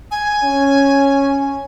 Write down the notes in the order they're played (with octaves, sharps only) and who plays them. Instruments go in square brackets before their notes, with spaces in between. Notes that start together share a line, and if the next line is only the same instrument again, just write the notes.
[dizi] G#5
[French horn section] C#4